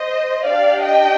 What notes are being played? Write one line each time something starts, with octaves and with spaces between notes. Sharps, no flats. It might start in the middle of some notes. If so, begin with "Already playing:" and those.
Already playing: C5 D#5
D4 G4 D5 F5
D#5 G5